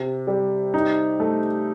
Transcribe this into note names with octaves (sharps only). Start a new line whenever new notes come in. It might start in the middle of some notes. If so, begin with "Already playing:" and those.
Already playing: C3
G3
D#4
A3